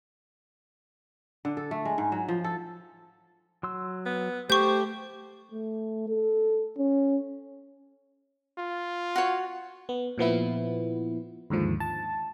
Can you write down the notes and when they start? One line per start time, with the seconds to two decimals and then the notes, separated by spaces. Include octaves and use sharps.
1.45 D3
1.57 A4
1.71 A3
1.85 G#3
1.98 G#2
2.12 F#3
2.28 F3
2.44 A4
3.63 F#3 C6 E6
4.06 B3
4.50 A3 G4 C5 C#6 G6
5.51 A3
6.08 A4
6.77 C#4
8.58 F4
9.16 F#4 C#5
9.89 B3
10.18 A#2 F3 B3 E4
11.50 D#2 G#2 D3 F3
11.80 A5